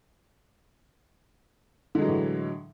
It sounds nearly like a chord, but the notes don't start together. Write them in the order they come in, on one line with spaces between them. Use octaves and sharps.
D3 G#3 F#3 E3 A2